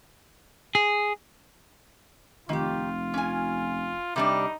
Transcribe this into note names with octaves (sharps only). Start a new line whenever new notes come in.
G#4
F1 D#3 F4 G4
C#4 G#5
C3 G3 D4 D#4